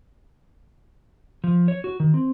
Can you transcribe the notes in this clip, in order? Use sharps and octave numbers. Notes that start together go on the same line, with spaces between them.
F3
C#5
F#4
D#3
C4